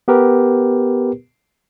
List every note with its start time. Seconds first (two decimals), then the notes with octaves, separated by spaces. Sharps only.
0.08 B3 G4 A#4 B4